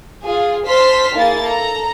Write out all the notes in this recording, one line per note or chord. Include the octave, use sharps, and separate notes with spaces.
F4 G#4
C5 A5 C6 F6 B6
A#3 E4 G#4 A6
A4 A#5